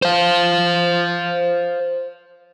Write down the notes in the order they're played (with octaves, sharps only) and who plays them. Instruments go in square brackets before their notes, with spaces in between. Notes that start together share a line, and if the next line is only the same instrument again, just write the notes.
[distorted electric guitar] C5 F5